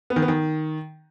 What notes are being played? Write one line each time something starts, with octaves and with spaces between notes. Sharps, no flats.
B3
D#3
B3
D#3